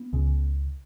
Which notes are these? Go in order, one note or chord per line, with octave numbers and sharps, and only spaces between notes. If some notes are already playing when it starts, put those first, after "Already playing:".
Already playing: B3
C#2 C#3